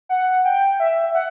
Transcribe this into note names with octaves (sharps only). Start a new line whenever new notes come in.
F#5
G5
E5
F#5